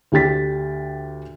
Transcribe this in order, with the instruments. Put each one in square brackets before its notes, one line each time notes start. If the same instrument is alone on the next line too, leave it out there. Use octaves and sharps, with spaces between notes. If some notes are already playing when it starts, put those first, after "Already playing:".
[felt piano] D2 D4 G4 G5 A6 B6